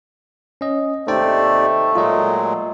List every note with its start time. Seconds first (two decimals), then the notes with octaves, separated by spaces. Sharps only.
0.61 C#4 D#5
1.08 D#2 C3 A3 D#4 C5 D5 G5
1.95 A#2 F#3 G#3 F4 D#5